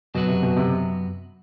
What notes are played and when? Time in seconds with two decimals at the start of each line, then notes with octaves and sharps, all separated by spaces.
0.15 F#2 B2 F#3 B3 F#4
0.29 C3
0.43 B2
0.57 C3